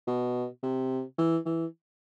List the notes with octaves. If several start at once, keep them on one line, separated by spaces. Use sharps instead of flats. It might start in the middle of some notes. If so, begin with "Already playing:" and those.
B2
C3
E3
E3